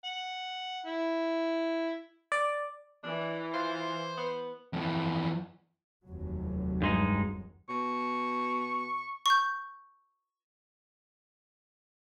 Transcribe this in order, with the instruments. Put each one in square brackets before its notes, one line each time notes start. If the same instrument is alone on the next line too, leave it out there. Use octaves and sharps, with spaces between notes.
[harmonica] F#5
E4
[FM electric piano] D5
[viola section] E3 [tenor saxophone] D4
[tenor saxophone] F4 [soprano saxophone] C5
[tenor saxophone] B3
[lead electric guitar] F2 E3
[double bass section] F1 D#2 F#3
[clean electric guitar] G2 G#3 D#4
[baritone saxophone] B2 [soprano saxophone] C#6
[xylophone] C#6 G6